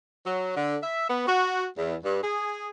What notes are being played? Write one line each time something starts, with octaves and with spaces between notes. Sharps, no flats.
F#3
D3
E5
B3
F#4
E2
G2
G#4